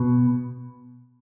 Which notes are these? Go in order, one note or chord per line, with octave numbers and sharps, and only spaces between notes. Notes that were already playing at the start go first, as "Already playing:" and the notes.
Already playing: B2